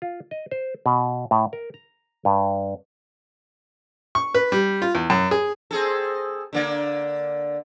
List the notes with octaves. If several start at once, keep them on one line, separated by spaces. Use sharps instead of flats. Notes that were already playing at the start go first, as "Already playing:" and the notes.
F4
D#5
C5
B2
A2
A#4
A#5
G2
C#6
B4
G3
F4
E2
F#2
G#4
C4 G#4 A4
D3 A#3 D5